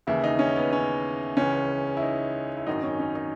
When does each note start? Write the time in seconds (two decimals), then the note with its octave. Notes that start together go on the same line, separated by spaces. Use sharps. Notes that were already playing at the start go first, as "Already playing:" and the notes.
0.07 D#2 C#3 E3 E4
0.24 D#4
0.39 C#4
0.56 B3
0.73 C#4
1.37 C#2 C#3 E3 C#4
1.97 E4
2.02 D#4
2.57 E4
2.67 G#1 F#2 D#3 F#3 D#4
2.83 C#4
2.99 C#4
3.15 D#4